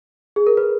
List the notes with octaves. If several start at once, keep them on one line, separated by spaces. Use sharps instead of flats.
G#4
A#4
B4